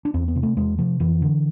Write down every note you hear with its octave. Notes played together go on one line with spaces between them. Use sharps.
D4
E2 C4
B3
C3
A3
E2 G#3
C3 F3
F2 E3
D3